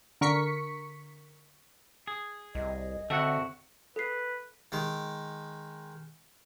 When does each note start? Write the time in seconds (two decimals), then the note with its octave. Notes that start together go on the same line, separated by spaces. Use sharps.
0.21 D3 A#4 C#6 B6 C#7
2.07 G#4
2.55 C2 D#5
3.10 D3 C4 F#4 A4 E5 F#5
3.96 A4 B4 C7
4.72 D#3 G#3